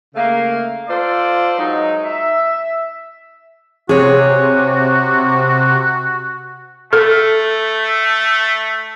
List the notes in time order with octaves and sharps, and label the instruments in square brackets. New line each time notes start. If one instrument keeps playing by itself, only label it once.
[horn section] C#3 A3 A#3
F4 A4 C5 D5
F#3 G#3 D#4
E5
[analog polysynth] C3 [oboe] F#4 [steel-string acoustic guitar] G#4 C#5
[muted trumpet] A3 [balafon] A4